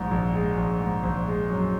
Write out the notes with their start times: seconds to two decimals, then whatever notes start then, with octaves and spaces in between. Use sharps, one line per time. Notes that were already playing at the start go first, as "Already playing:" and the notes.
Already playing: A#1 G#2
0.11 A#1
0.34 G#3
0.57 A#1
0.80 G#2
1.03 A#1
1.27 G#3
1.49 F#2